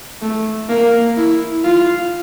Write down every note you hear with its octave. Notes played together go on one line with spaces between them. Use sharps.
A3
A#3
E4
F4